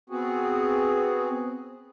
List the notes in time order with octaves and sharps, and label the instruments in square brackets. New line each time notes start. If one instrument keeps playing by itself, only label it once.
[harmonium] B3 C4 F#4 G#4